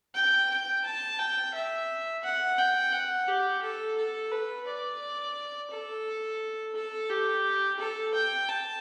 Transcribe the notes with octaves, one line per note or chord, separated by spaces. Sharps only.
G5
G5
A5
G5
E5
F#5
G5
F#5
G4
A4
A4
B4
D5
A4
A4
G4
A4
G5
A5